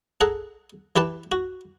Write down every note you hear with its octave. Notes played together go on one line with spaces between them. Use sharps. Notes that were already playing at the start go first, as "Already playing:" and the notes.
G#4 A4 F#5 A#5
E3 G4 B4 A5
F#4